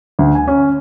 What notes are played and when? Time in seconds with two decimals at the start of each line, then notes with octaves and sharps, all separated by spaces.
0.19 D2
0.35 G#5
0.48 C#4